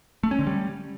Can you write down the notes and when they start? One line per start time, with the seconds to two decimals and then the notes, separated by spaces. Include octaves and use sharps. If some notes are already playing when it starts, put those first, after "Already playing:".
0.23 A3
0.31 C#4
0.39 D3
0.47 G3